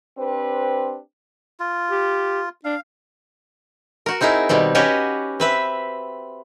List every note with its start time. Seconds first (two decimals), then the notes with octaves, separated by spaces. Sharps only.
0.18 C4 D4 G4 B4 C5
1.60 F4
1.91 G4
2.64 D4 F5
4.06 F#4 A#4
4.21 C4 D#4 E4 G#4 A#4
4.49 B2 D#3 G3 C4
4.75 C#4 F#4 G4 B4 C#5 D#5
5.40 C4 B4 E5